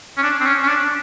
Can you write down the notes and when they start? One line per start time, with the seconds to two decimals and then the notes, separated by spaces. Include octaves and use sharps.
0.17 C#4
0.23 D4
0.40 C4
0.46 C#4
0.63 C#4
0.68 D4